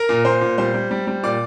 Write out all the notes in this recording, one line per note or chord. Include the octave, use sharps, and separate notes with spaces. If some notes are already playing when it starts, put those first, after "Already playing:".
Already playing: A#4 A#5
A#2
A#2 C5 C6
A#2
G3 C5 C6
G3
G3
G3
A#2 D5 D6